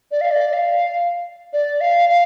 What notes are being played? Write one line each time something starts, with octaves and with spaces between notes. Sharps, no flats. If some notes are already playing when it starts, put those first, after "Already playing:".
D5
F5
D5
D5
F5
D5
F5
F5